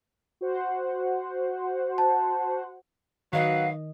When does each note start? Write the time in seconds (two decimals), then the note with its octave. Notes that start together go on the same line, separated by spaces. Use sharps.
0.41 F#4 C5 F#5
1.98 A5
3.33 D#3 F#3 F#4 B4 D#5 F5